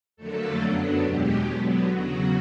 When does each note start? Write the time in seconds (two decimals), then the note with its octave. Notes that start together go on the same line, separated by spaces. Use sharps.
0.17 F2 D3 F#3 A3 A#3 A4
0.60 F#2 D3 F#3 B3 D4
1.02 E2 B2 G#3 G4
1.45 D3 F#3 B3
1.87 E2 C#3 F#3 F#4